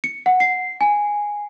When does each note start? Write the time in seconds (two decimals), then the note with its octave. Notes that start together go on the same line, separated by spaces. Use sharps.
0.04 C#7
0.26 F#5
0.40 C7
0.81 G#5